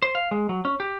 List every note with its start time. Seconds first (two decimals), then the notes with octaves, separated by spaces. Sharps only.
0.02 C5
0.15 F5
0.31 G#3
0.49 F#3
0.65 C#4
0.80 G4